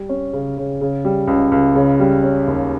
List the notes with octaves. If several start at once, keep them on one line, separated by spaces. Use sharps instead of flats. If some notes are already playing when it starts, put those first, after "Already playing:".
Already playing: G3
C#4
C#3
C#3
C#3
G3
C#2
C#2
C#3
G3
C#4
D#2